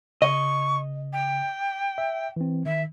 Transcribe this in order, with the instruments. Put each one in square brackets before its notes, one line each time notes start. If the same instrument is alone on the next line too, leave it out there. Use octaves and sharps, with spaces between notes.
[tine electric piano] C#3 [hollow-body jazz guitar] D#5 [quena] C#6
[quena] G5
[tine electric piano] E5
E3 C4
[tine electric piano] D#3 [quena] E5